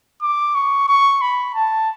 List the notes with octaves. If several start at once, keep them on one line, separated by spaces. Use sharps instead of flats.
D6
C#6
C#6
B5
A5